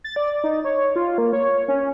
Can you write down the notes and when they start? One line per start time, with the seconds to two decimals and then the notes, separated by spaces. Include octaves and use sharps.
0.04 A6
0.16 D5
0.44 D#4
0.64 C#5
0.96 F4
1.18 A#3
1.33 C#5
1.68 C#4